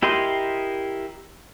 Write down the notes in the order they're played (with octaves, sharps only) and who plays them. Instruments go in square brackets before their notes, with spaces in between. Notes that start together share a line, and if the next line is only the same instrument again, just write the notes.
[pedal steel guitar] E4 G4 A#4 D#5 C6